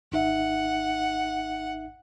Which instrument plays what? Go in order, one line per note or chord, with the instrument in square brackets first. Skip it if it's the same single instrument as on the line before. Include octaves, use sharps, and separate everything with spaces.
[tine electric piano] G#1 D#4 E5 [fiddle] F#5